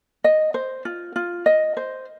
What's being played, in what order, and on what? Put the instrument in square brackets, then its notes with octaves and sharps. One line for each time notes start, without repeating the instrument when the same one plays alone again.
[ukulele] D#5
C5
F4
F4
D#5
C5